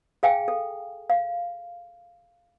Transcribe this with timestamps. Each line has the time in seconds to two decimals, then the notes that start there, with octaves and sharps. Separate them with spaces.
0.23 G#4 F5 G5 G#5
0.48 A4
1.10 F5